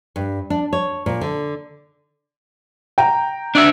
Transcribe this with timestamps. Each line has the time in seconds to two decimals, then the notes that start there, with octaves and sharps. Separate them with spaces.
0.16 G2
0.50 D4
0.73 C#5
1.06 A#2
1.21 D3
2.98 G5 A#5
3.55 D4 D5 E5